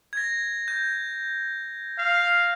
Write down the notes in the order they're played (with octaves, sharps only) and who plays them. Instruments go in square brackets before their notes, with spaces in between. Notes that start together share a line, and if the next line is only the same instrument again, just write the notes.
[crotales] G#6 A#6
G6
[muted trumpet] F5